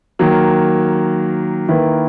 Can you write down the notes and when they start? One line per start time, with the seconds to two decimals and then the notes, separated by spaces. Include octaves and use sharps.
0.19 D#3 F#3 A#3
1.68 D#3 A#3 E4 B4